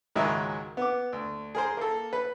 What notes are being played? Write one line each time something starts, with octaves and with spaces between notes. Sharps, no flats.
C#2 G#2 D#3 F#3 D#5 E5
B3 D6
D2
G#4 A#4 C5
A#3 A4
B4